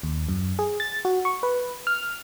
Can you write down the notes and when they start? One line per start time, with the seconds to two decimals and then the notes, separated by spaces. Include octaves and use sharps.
0.03 D#2
0.29 F#2
0.59 G#4
0.80 A6
1.05 F#4
1.25 C#6
1.43 B4
1.87 F6